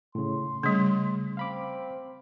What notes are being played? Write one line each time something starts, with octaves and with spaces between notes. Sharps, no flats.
A2 C#3 C6
C#3 G3 A3
C4 F5 B5 D6